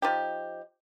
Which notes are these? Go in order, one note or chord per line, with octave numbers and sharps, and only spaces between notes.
F3 D#4 G4